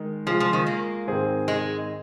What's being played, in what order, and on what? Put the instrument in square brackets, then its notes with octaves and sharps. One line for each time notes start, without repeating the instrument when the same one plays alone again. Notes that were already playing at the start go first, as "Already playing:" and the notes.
Already playing: [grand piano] D#3 G#3 D#4
[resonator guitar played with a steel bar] F3 [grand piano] G#3 F4 G#4
[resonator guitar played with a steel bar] F3
D#3
A#3
[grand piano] G#2 D#3 C4 G#4 C5
[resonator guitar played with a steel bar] G#3